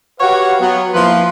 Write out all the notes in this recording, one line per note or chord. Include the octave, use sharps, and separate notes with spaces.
F#4 G4 B4 C#5 F5 F#5
F#3 B3
F3 A#3 E4 B4 C6